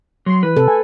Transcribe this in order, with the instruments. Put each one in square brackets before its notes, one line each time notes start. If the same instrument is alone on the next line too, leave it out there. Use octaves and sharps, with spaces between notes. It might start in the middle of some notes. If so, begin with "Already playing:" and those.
[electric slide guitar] F#3 [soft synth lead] C6
[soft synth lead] E3 [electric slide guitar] B4
[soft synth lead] C3 [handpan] A4
[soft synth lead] G#5